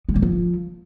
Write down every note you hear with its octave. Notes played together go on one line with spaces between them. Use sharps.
G#3
G#2
F3